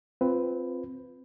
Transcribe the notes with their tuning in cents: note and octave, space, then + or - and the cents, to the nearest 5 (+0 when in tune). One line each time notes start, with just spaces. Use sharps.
C4 +0 F4 +0 B4 +10